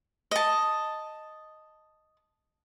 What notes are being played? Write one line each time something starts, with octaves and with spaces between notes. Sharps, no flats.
D#5 A5